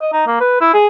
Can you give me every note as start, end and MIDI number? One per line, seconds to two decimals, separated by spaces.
0.01 0.09 75
0.12 0.24 63
0.27 0.38 58
0.40 0.57 71
0.61 0.71 64
0.74 0.87 68